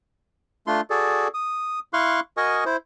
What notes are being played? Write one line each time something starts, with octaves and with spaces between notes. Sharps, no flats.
A3 D4 F4 C6
F#4 G#4 A4 D5
D#6
E4 F5 C6 C#6 F#6
F#4 A#4 D#5 G#5 C#6 D#6
E4 C5